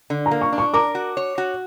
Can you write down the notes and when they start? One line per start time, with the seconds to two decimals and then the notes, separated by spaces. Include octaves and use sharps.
0.10 D3
0.26 A#5
0.31 A#3
0.41 C#6
0.52 D4
0.58 C#6
0.74 A#4 D6
0.95 F#4
1.17 C#5
1.38 F#4